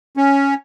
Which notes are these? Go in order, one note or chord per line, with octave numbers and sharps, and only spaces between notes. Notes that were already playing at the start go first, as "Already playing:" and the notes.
C#4